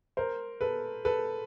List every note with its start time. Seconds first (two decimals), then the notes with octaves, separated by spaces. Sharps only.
0.17 A#4 C5
0.61 A4 B4
1.05 A4 B4